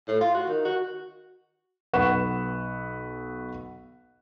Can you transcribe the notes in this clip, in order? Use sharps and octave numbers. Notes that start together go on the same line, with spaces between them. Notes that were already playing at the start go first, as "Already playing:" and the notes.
A2
F4
F#4
D#3
F#4
B1 B4 F#5 C#6 E7